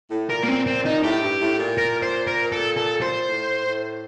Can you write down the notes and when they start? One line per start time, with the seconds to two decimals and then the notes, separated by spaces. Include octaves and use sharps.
0.10 A2
0.30 A#2 A#4
0.43 A#3
0.48 C4
0.67 C4
0.85 D#4
1.03 A2 G4
1.22 G2
1.41 A2
1.60 A#2
1.78 A#4
2.02 C5
2.27 A#4
2.52 A4
2.77 A4
3.02 C5
3.27 A2
3.65 A2